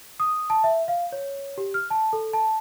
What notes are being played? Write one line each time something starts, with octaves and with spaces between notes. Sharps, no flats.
D#6
A5
E5
F5
C#5
G4
F6
A5
A4
A5